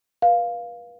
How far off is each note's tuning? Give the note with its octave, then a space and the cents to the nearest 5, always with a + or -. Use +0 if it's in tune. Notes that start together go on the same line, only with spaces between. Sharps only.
B4 -35 F5 +0